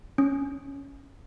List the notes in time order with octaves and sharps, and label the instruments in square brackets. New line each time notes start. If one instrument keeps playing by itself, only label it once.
[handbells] C#4